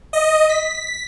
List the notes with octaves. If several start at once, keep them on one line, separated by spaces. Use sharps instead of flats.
D#5
B6